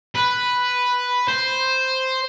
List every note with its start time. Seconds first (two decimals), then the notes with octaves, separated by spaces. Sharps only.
0.15 B4
1.28 C5